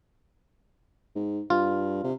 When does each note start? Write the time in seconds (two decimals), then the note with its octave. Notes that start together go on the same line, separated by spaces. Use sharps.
1.15 G#2
1.50 G2 F4
2.04 C3